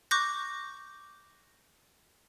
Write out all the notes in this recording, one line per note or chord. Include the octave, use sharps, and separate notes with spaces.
C#6 D6 F#6 G6 A#6